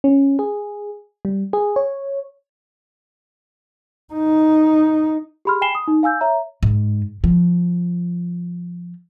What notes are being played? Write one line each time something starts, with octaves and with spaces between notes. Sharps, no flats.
C#4
G#4
G3
G#4
C#5
D#4
G4 G#4 B5 C6 F6
G5 G#5 B5 C7 E7 G7
D#6
D#4
F5 G#5 E6 G6
C#5 E5 A#5
G#2
F3